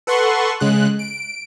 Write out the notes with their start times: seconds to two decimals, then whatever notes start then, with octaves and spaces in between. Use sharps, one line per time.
0.07 A4 B4 F#5 C6 C#6
0.60 C#3 G#3 F#6
0.99 D7